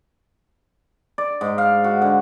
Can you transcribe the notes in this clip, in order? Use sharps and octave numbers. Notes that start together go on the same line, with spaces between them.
D5
G#2
F5
F#4
D3